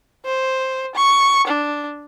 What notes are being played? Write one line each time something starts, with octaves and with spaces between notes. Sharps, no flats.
C5
C#6
D4